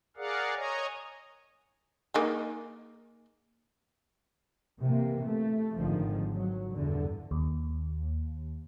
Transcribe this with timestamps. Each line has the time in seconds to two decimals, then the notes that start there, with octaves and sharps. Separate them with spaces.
0.17 G#4 A#4 D5 F5 F#5
0.56 C#5 D#5 G#5 A#5
2.14 A#3 D#4 G#4
4.81 C3 E3 A#3
5.26 A3
5.77 G#1 D3 D#3 F3
6.33 F#3
6.76 E2 G2 D3
7.31 D#2